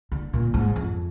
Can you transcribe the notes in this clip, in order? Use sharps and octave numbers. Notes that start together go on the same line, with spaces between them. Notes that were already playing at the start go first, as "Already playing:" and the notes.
D3
A#2
G#2
F2